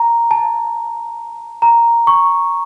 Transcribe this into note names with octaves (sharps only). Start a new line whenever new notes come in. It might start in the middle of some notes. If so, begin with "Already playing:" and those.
Already playing: A#5
A5
A#5
C#6